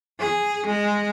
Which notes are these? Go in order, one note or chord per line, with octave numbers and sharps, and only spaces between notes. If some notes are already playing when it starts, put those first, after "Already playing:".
G#4
G#3